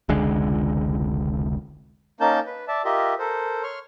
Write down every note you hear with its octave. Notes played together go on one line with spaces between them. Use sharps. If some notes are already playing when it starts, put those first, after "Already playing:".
F1 C#2 D3 G#3
A#3 C#4 D#4 A#4 A5 G6
B4
D5 E5 A5
F4 G4 A#4 D#5 E5
A4 A#4 C5
C#5 C6 C#6 F6